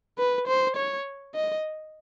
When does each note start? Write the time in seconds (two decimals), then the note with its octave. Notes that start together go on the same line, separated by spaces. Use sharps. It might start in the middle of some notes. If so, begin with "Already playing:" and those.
0.18 B4
0.47 C5
0.76 C#5
1.35 D#5